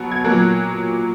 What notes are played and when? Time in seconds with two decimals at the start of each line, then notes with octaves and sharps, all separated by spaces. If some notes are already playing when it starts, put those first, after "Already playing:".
Already playing: B2 F#3 B3
0.12 G#6
0.24 A#2 F#3 A#3 F#6